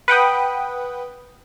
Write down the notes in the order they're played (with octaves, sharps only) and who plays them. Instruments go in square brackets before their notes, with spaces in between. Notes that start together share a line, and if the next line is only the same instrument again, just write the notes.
[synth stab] B4 F#5 G5 D#6